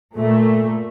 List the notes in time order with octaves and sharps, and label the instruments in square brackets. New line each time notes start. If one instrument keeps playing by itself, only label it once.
[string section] A#2 A3